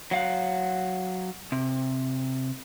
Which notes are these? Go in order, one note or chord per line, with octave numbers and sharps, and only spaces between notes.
F#3 F5 F#5
C3